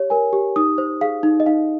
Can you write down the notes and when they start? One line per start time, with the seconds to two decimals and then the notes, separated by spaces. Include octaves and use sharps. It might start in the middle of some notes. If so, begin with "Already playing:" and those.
Already playing: G4 C#5
0.10 A#4 G#5
0.33 G4
0.56 D#4 D#6
0.78 C5
1.01 G#4 F5
1.23 D#4
1.40 D#5
1.46 D#4 F5